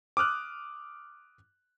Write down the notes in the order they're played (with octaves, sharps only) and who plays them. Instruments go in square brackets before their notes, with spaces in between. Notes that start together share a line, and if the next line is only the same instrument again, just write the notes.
[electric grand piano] D6 D#6 F6 F#6